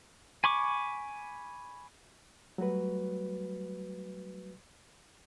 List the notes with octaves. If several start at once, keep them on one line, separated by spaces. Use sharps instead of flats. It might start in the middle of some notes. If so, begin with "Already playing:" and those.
G#5 B5 C#6 D6
F#3 G3 A3 F#4 B4